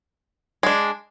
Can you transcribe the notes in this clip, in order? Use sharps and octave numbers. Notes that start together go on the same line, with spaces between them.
G#3 D4